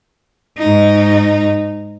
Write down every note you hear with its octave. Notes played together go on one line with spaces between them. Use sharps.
G#2 D#4